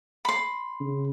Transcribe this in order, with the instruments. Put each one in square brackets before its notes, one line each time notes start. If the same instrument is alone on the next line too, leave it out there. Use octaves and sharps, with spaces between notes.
[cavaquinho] B5 C6
[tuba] C#3